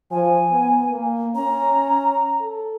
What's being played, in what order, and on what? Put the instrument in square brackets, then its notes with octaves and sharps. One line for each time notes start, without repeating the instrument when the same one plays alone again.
[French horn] F3 [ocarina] G#5
[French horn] B3
A#3
[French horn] C#4 [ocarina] A#5
[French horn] A4